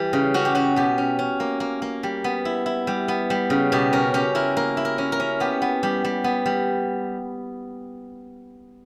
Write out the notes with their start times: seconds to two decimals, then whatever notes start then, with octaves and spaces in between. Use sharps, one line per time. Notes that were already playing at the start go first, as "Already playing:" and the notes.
Already playing: E3 G3
0.13 C#3
0.34 C#4 F#4
0.45 G4
0.55 C#4 F#4
0.76 B2 G4
0.98 C#4
1.19 C#4
1.40 A#3
1.60 A#3
1.82 A#3
2.03 G3
2.24 B3
2.45 E4
2.66 E4
2.87 G3
3.08 B3
3.30 G3
3.50 C#3
3.72 B2 G4
3.93 C#4 A#4
4.14 C#4 G4
4.35 E4 A#4
4.57 A#3 A#4
4.77 E4
4.85 A#4
4.98 C#4
5.12 A#4
5.20 C#4
5.40 B3 G4
5.62 B3
5.83 G3 G4
6.04 G3
6.24 B3
6.46 G3